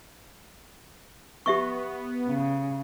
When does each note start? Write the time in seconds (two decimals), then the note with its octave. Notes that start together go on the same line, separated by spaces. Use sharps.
1.46 B3 G4 E5 C#6
2.28 C#3